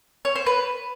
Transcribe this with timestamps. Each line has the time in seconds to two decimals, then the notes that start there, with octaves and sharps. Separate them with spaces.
0.25 C#5
0.36 C5
0.46 B4